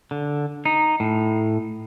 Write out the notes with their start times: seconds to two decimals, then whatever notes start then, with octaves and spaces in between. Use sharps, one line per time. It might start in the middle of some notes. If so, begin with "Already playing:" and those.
0.11 D3
0.65 D#4
1.00 A2